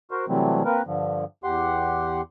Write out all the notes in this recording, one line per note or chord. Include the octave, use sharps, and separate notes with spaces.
F#4 A#4 C5
C3 E3 F#3 G3 A3 C4
A#3 C4 A#4 B4
G2 D3 F3
E2 G4 F#5 C6